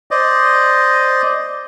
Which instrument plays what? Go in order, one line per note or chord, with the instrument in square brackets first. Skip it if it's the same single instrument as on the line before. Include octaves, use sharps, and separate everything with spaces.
[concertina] C5 D5 D#5